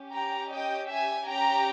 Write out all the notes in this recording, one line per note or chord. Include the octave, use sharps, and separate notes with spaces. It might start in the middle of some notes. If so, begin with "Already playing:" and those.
Already playing: C#4 G4
G5 A#5
D#5 G5
E5 G#5
C#4 G4 G5 A#5